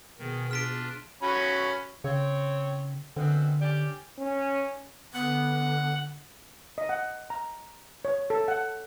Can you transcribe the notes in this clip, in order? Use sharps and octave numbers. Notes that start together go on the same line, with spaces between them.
B2 D#3 B3 G#4
D4 F4 F6 B6 D7
C#4 F#4 B5
C#3 C4 C#5
F#2 B2 D3 C4
C#4 G4 D5
C#4
D3 B3 F#5
D#5
F#5
A#5
C#5
A4
F#5